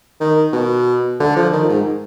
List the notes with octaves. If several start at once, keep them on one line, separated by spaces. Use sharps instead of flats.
D#3
B2
D3
F3
D#3
G#2